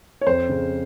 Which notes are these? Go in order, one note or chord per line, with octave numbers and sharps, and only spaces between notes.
C#5
F2 C5
C#3